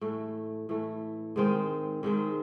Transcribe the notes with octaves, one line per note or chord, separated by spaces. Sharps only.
A2 E3 A3
A2 E3 A3
G#2 D#3 G#3 C4
G#2 D#3 G#3 C4